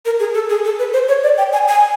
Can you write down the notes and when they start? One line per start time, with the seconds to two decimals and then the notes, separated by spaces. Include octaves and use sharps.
0.05 A#4
0.20 G#4
0.34 A4
0.49 G#4
0.65 A4
0.79 B4
0.93 C5
1.08 C#5
1.23 D5
1.38 G5
1.53 G#5
1.68 G#5